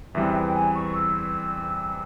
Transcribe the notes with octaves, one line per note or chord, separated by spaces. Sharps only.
E2 E3 G3 C4 E5
G5
G#5
C#6
E6